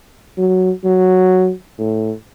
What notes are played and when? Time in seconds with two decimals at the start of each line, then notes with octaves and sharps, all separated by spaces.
0.38 F#3
0.84 F#3
1.79 A2